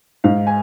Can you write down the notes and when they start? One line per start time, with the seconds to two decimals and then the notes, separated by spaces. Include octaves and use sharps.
0.24 G#2 F5
0.47 G#5